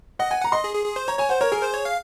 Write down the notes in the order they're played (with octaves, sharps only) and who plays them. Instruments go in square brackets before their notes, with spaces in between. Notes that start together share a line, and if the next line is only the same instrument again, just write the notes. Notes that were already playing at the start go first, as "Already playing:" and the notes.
[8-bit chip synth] D#5 [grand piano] F#5
[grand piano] F#5 [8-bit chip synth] G#5
[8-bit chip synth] F#5 [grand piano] A#5
[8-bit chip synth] D#5 [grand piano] C6
[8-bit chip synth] G#4
G#4
G#4
C5
[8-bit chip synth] C#5 [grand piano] A#5
[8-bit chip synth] C#5 [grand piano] G#5
[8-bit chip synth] C5 [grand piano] F#5
[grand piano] A#4 [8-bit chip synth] C#5
[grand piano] G#4 [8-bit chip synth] A#4
[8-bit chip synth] C5
C#5
F5